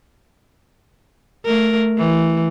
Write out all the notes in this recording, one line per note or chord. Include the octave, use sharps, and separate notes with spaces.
A3 A#4
E3